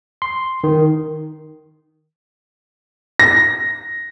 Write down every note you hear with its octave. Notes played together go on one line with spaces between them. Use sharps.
C6
D#3
A#6